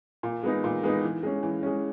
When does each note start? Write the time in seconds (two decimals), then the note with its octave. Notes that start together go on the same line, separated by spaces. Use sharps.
0.23 A#2
0.43 G#3 B3 D#4
0.64 A#2
0.83 G#3 B3 D#4
1.03 E3
1.23 G#3 C#4
1.43 E3
1.63 G#3 C#4